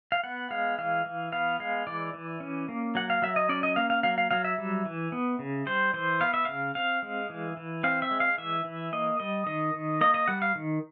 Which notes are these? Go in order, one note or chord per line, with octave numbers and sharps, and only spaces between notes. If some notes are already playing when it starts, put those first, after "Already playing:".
F5
B3 F#5
G#3 F5
E3 F5
E3
B3 F5
G#3 F5
E3 D5
E3
C#4
A#3
F#3 F#5
F5
F#3 E5
D#5
C#4 D5
D#5
A#3 F5
F5
F#3 F5
F5
F#3 F5
E5
G3
E3
B3
C#3
G3 C5
E3 C5
B3 F5
E5
C#3 F5
C4 F5
G#3
E3
E3
C4 F5
E5
G#3
F5
E3 E5
E3
A#3 D#5
G3 D#5
D#3 D#5
D#3
A#3 D#5
D#5
G3 F#5
F5
D#3